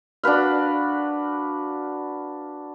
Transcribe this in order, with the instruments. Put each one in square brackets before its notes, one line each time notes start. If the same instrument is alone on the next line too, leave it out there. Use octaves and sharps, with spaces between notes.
[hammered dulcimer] D4 F#4 B4 F5